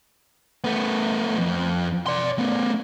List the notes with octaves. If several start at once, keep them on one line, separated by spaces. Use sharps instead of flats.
A3 B3
F2
D5 C6
A3 B3